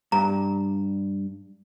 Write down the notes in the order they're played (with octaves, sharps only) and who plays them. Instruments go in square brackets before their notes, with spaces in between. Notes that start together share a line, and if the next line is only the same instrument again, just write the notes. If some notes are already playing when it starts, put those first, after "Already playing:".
[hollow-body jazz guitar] G2 [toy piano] A#5